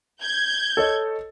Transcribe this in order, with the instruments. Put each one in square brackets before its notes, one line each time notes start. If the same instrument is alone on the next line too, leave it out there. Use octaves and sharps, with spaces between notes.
[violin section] G6 G#6
[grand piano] A4 C#5 D#5